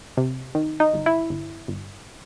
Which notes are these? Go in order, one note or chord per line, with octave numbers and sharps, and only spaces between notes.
C3
D#3
D#4
G1
E4
G1
G1